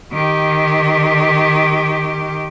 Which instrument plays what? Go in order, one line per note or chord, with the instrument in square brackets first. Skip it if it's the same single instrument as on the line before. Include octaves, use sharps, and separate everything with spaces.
[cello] D#3 G4